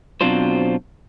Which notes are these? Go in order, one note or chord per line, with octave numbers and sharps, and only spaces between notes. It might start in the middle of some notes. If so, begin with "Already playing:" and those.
B2 F#3 C4 D4 F4 C5